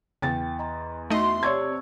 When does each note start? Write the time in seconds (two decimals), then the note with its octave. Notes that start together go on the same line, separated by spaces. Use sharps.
0.22 E2 C#3 G5 A6
0.59 D#5 A#5 C6
1.10 A3 D#4 F#4 D#5 E5 C6
1.43 C3 C#5 D5 A5 C#6 E6 G#6